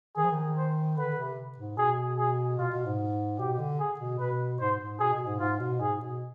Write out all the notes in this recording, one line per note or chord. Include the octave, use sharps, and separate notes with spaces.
D#3 G#4
F3
D#3
C5
D3 B4
D3
C3
G#2
B2 G#4
G#4
B2 F4
B2
G#2
B2 G4
D3
G#4
B2
B2 B4
G#2 C5
G#2
B2 G#4
B2
G#2
G#2 F4
B2
G#2 G#4
B2